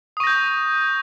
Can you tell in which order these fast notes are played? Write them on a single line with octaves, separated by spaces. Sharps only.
D#6 C#6 A#6 G6